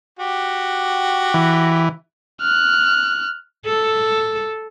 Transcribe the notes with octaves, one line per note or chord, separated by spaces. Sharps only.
F#4 G4
E3
F6 F#6
A4